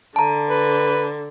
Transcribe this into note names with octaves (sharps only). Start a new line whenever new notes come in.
D3 A5 A#5
B4